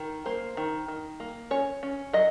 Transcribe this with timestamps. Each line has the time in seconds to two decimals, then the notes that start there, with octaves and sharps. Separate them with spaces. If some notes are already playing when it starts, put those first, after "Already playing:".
Already playing: D#3
0.26 A#3 C5
0.57 D#3
0.88 D#3
1.20 A#3
1.51 C#4 C#5
1.83 C#4
2.13 F#3 D#5